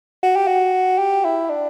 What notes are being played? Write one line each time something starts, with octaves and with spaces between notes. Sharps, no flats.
F#4
G4
F#4
G4
E4
D4